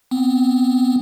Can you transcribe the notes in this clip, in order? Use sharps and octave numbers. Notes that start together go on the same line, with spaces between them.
B3 C4